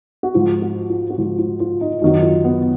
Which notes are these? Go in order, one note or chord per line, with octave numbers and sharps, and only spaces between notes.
F#4
G#2 F3 F4
F#4
F4
F#4
G#2 F3 F4
F4
F4
D#4
F#2 D#3 F#3 D#4
F4
B3